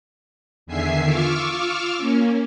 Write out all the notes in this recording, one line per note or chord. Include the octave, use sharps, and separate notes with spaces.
E2 D3 D#3 E5 G#5 C7
F4 C#6 D6 E6 F6
A#3 C#4